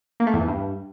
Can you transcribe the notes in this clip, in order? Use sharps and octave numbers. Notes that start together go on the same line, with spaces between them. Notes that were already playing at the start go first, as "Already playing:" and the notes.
A#3
A3
E2
E3
G2